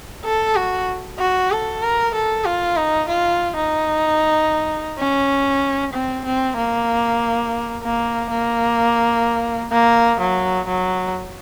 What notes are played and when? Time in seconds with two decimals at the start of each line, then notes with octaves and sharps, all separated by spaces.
0.25 A4
0.56 F#4
1.19 F#4
1.51 A4
1.82 A#4
2.14 A4
2.45 F4
2.77 D#4
3.09 F4
3.56 D#4
4.99 C#4
5.93 C4
6.25 C4
6.57 A#3
7.83 A#3
8.30 A#3
9.72 A#3
10.20 F#3
10.68 F#3